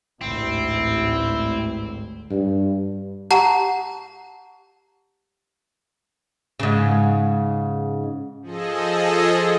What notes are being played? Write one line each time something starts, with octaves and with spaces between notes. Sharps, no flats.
A1 D2 G#2 C4 E4
G2
G4 F#5 A5 A#5
G#2 C#3
F3 G#4 A4 D#5